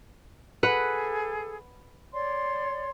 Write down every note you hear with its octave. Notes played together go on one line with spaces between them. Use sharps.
G#4 A4 B4 F#5
C#5 D5 C6